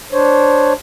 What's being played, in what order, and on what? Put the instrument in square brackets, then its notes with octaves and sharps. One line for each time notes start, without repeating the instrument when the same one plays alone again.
[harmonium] D4 C5 C#5